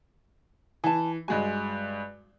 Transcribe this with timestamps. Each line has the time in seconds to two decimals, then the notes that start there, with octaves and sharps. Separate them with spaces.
0.84 E3 G#5 A5
1.28 G2 G#3 F#4 G#5